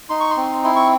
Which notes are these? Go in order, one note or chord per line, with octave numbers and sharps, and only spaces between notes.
D#4 C6
C#6
C6
C4
E4 C6
C#6